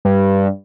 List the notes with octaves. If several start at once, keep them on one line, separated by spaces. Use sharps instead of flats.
G2